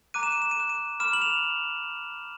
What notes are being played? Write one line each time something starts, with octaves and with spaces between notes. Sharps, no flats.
A#5 D6 F#6 D#7
E7
D#7
E7
D#7
A#5 D6 F#6 E7
D#7
B5 D6 F6 E7
F#7
F7